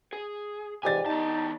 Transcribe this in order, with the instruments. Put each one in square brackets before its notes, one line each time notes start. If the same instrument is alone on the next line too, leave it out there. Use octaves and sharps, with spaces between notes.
[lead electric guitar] G#4
[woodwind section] F2 G#2 E3 [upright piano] G4 D5 A6 [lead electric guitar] G#5
[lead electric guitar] E2 A5 [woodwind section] D#4